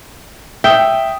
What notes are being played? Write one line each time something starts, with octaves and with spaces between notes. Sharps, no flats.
E5 G5 D#6